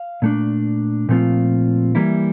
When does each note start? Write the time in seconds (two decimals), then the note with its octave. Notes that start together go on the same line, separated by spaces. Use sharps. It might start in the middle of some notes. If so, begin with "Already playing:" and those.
Already playing: F5
0.22 A#2 A3 D4
1.09 A#2 F3 A3 C4 F4
1.95 E3 G3 A#3 E4